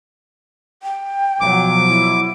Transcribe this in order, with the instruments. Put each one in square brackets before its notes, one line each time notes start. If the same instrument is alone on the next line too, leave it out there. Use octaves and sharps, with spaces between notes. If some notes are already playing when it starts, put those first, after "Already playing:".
[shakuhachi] G5
[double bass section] B2 F3 F#3 [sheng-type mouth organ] D6
[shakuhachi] E4